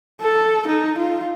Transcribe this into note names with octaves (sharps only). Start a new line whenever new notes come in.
A4
D#4
F4